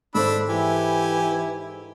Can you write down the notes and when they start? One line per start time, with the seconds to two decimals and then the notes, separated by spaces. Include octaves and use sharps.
0.15 G#2 D4 A4 C5 B5 E6
0.49 E3 E4 G4 G#5